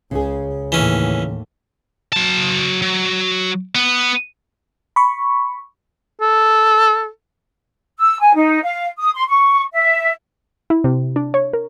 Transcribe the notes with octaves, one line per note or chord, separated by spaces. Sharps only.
C#2 C#3 G#4
D#2 A2 E3 C#4
F#3 A5
F#3
B3
B5 C#6
A4
E6
G#5
D#4
F5
D#6
C6
C#6
E5
E4
C3
D4
C#5
A#4